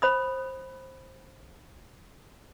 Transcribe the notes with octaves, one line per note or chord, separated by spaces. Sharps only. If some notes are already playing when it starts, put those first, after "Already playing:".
C5 B5 D#6